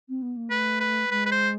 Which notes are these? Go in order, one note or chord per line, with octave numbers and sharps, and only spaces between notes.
C4
B3
A#3
A3 B4
B4
G#3 B4
B4
C5